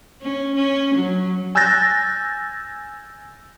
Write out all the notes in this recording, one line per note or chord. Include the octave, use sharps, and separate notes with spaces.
C#4
C#4
F#3
G#5 E6 F#6 G6 A6 A#6